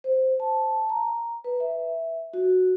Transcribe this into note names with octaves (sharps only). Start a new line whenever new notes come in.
C5
A5
A#5
B4
E5
F#4